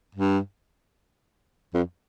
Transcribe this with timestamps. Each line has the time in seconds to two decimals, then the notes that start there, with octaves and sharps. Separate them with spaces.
0.15 G2
1.74 F2